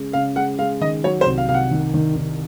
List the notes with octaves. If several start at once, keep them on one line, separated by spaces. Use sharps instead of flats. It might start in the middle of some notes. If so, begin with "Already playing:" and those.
Already playing: C#3 G#3
C#3 F5
G#3 F#5
G#3 F5
D#3 D#5
F#3 C#5
C5
C2
F5
C2 F5
F#5
D#3
D#3
D#3